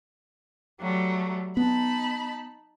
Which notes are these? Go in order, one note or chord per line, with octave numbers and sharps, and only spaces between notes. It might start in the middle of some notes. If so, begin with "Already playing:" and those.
F#3 G3 A3
B3 D#4 A5 B5